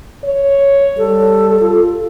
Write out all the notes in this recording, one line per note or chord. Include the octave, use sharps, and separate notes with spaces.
C#5
G3 A4
F4